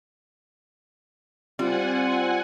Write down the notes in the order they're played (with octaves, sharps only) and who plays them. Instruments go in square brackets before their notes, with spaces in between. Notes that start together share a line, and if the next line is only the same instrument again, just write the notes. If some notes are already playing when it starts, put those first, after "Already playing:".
[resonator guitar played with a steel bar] G3 [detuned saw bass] C4 [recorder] F4 [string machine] F#5 G#5